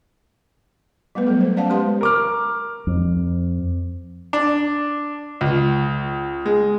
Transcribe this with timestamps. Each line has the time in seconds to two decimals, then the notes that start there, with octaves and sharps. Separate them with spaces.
1.15 G3 A3 B3 B4
1.27 F#3 B3 A4
1.41 C5
1.57 C#4 D5 F5 F#5 A5
1.70 G#3 G4 B4 C6
2.01 A#4 D6 F6
2.87 F2
4.33 D4
5.41 C#2
6.46 G#3